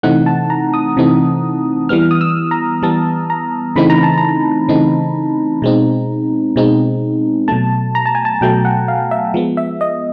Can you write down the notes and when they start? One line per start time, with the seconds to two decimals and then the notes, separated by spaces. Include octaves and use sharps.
0.03 C3 E3 A3 C4 D#4 F#5
0.26 A5
0.50 A#5
0.74 D#6
0.97 C3 E3 A3 C4 D#4
1.89 E3 G3 B3 F6
2.11 D#6
2.21 E6
2.51 A#5
2.82 E3 G3 B3 A5
3.30 A#5
3.76 C#3 E3 A3 C4 D#4 B5
3.90 A#5
4.03 A5
4.18 A#5
4.68 C#3 E3 A3 C4 D#4
5.62 B2 G#3 C4 D#4
6.56 B2 G#3 C4 D#4
7.48 B2 F#3 A3 A5
7.95 A#5
8.06 A5
8.15 G#5
8.25 A5
8.41 B2 F#3 A3 G5
8.65 F#5
8.88 F5
9.11 E5
9.34 F3 G#3 B3
9.57 E5
9.81 D#5